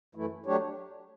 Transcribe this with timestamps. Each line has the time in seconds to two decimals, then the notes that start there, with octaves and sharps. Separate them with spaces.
0.15 F#2 E3 A3 E4
0.46 F#3 A3 D4 G4 C#5